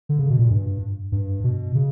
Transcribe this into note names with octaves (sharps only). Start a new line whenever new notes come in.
D3
C#3
B2
A#2
G2
G2
B2
C#3